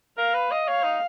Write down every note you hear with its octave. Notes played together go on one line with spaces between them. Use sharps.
A#4 F5
B4
D#5
C#5 F5
D#4